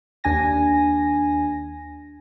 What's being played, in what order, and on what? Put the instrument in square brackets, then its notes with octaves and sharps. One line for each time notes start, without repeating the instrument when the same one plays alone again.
[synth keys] D#2 D4 G#5 A#6